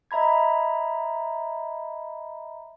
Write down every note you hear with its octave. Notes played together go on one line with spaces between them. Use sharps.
D#5 E5 A#5 B5 G#6